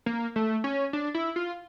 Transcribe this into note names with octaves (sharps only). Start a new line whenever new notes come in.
A#3
A3
C#4
D4
E4
F4